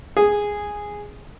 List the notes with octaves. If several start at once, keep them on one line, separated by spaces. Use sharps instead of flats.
G#4